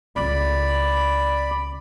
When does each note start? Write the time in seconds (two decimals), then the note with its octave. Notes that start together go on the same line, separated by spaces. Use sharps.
0.16 C#2 A3 D5 B5